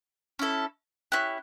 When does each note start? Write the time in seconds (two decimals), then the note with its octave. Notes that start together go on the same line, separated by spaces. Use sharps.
0.39 C#4 E4 A4
1.12 C#4 E4 G4 F#6